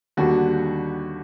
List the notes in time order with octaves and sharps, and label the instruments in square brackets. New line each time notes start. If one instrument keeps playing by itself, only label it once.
[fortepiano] D#2 D3 G3 F#4